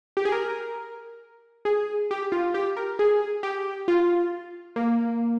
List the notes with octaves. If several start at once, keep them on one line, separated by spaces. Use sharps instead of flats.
G4
G#4
A#4
G#4
G4
F4
G4
A#4
G#4
G4
F4
A#3